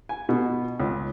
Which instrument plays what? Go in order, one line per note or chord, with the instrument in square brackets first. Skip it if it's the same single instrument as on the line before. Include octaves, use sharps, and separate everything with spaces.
[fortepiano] G#5
B2
C#2